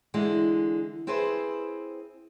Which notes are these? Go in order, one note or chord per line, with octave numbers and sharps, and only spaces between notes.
D3 E3 G#3
C4 E4 G#4 B4 C5